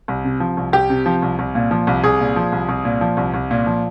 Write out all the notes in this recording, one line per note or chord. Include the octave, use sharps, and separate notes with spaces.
C2
C3
F3
C2
C2 G4
C3
F3
C2
C2
A#2
F3
C2
C2 G#4
A#2
F3
C2
C2
A#2
F3
C2
C2
A#2
F3